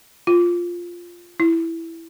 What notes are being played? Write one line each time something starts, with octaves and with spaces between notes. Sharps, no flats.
F4
E4